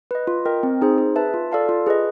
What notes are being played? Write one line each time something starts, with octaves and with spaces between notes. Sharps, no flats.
B4 D#5
F4
A#4 D#5 G5
C4
D#4 G#4 C5
G#4
B4 E5 A5
F4
A4 D5 F5 A5
F4
G#4 B4 D#5